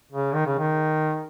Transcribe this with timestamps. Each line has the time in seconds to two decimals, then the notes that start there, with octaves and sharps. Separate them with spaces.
0.12 C#3
0.34 D#3
0.46 C#3
0.58 D#3